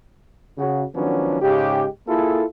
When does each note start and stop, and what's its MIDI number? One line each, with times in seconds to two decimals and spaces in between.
0.58 0.83 49
0.58 0.83 66
0.95 1.41 51
0.95 1.41 53
0.95 1.41 54
0.95 1.41 59
0.95 1.41 61
0.95 1.41 62
1.41 1.85 44
1.41 1.85 49
1.41 1.85 56
1.41 1.85 67
2.08 2.43 58
2.08 2.43 64
2.08 2.43 65
2.08 2.43 68
2.08 2.43 69